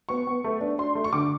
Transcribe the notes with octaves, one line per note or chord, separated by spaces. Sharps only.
B3 C#6
B3
A3
D4
D4 C6
A3
C#6
D3 D6